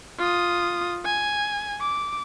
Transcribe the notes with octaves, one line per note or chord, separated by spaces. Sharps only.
F4 D#6
G#5
D6